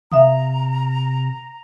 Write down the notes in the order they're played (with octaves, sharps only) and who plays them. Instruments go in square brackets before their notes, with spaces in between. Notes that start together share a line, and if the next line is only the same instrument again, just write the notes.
[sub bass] C3 [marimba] E5 F5 D#6 [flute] A#5